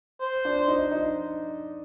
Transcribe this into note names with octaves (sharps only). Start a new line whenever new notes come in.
C5
D4
D#4
D#4